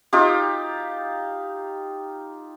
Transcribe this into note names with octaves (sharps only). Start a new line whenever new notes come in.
D#4 F4 G4